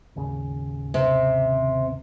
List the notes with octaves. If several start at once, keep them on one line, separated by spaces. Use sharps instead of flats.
G#1 D#2 C#3
C3